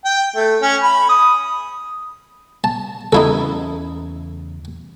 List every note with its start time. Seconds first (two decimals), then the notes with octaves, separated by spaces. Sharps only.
0.05 G5
0.36 A3
0.62 C#4
0.83 B5
1.09 D#6
2.64 A5
3.13 E2 C#3 C#4 D#4 E4 A4